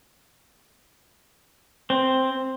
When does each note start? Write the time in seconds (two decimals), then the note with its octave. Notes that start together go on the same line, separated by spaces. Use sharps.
1.90 C4